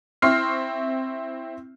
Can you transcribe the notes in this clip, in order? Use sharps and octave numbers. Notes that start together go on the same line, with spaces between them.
C4 E4 C6 C#6 F6 C7